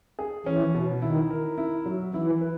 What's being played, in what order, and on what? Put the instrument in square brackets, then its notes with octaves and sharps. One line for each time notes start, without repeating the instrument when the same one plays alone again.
[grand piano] G#4
[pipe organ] E3 [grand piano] C#4
[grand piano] B2
[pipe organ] D#3 [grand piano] E4
[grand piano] A#4
E4
F#3
[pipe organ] E3 [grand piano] E4
[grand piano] B4